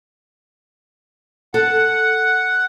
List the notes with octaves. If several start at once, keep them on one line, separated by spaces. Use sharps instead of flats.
A4 F#5